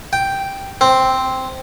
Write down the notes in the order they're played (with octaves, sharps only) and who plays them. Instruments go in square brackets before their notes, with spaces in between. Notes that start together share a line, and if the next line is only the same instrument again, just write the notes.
[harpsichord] G5
C4